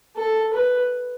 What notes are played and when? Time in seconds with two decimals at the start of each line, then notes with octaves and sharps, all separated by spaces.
0.16 A4
0.53 B4